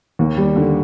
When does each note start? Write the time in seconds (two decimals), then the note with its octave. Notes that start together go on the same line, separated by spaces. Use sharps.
0.19 D#2
0.37 G3
0.56 D3